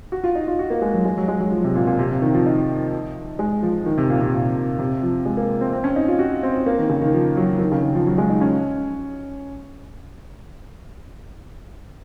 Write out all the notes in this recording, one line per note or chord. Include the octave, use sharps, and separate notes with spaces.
F#4
F4
D#4
F4
F#4
A#3
G#3
F#3
G#3
F#3
G#3
F#3
F3
C3
A#2
A#2
C3
C3
D#3
F3
D#4
G#3
F3
D#3
C3
A#2
C3
A#2
C3
F3
G#3
A#3
C4
C4
C#4
D#4
F4
F#4
C4
A#3
D#3
C#3
D#3
F3
F#3
D#3
C#3
D#3
F3
F#3
G#3
D#4
C#4